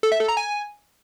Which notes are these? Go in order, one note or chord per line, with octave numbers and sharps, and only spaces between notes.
A4
E5
A4
A#5
G#5